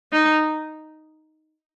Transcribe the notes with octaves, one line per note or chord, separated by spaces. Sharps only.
D#4